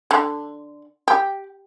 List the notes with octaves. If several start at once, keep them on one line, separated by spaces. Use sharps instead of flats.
D3
G4